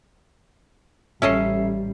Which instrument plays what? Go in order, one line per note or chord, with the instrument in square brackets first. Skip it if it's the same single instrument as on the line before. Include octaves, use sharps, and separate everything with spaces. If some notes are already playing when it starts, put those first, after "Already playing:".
[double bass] A1 G3 [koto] C#4 A4 D#5 [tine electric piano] E5 C7